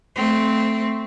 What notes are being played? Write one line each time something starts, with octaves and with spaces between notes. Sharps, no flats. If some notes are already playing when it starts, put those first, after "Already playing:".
A3 C4